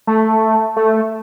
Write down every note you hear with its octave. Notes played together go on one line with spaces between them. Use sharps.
A3
A3